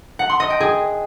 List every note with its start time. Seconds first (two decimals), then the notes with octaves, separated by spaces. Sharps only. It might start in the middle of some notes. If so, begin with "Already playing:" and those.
0.19 F#5
0.30 C6
0.40 D#5
0.50 G5
0.60 G#4